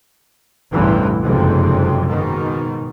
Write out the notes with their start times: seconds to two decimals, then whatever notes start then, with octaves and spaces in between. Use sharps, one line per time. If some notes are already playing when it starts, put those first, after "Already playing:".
0.73 A1 E2 G2 C3 E3
1.23 F#1 F2 G#2 C3
2.05 G#2 B2 D#3